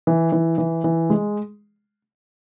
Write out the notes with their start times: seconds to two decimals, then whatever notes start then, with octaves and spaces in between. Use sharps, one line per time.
0.07 E3
0.32 E3
0.58 E3
0.84 E3
1.10 G#3